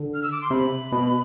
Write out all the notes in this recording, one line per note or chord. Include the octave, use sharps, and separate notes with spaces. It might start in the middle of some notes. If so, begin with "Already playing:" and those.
Already playing: D3
F6
E6
D6
C6
C3 B5
B2